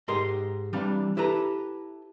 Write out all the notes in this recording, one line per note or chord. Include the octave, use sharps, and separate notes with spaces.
G#2 G4 A#4 D#5 C6
C3 E3 G3 D4 F5
E4 G4 A4 B4 A#5